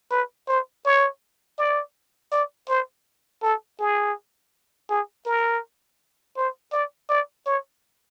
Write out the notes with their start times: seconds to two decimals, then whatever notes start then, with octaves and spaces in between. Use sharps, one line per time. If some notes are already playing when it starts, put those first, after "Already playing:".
0.11 B4
0.48 C5
0.85 C#5
1.58 D5
2.32 D5
2.69 C5
3.43 A4
3.79 G#4
4.89 G#4
5.26 A#4
6.37 C5
6.72 D5
7.09 D5
7.46 C#5